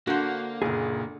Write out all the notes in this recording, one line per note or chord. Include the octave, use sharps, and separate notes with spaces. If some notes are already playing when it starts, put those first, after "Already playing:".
D3 A#3 F#4 C5
F#1 A#2 G#4